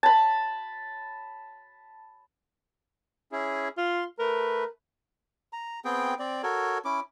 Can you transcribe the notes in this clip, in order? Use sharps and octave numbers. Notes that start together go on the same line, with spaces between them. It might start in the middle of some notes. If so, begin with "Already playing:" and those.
A5 B5
C#4 E4 G#4
F4 F5 C6
A3 A#4 B4
A#5
B3 C4 G#4 G5
C4 D5
F#4 A4 A#4 C#5
C#4 E4 D6